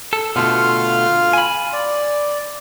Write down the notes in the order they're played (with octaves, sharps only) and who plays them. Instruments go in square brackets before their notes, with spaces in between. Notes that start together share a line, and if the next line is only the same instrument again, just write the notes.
[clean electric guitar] A4
[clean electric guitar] B2 D3 A3 [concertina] F4 F5 F6
[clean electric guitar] G#5 B5
[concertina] D5